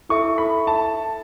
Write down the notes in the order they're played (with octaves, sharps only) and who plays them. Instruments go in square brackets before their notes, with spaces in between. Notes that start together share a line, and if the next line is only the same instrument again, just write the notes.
[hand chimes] E4 A4 E5 [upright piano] C#6
[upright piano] B5
A5